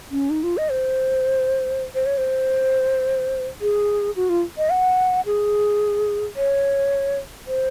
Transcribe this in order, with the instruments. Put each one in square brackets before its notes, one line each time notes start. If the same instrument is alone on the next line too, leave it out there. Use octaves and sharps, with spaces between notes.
[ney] C#4
D#4
F4
D#5
C5
C5
C#5
C5
G#4
F#4
F4
D#5
F#5
G#4
C#5
C5